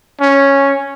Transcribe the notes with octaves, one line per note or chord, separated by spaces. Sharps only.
C#4